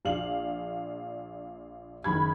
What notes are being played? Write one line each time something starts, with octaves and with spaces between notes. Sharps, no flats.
A#1 D4 F5 F#7
F#1 D#3 B5 G#6